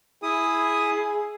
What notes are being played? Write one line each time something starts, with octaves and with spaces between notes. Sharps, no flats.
E4 G#4 D#6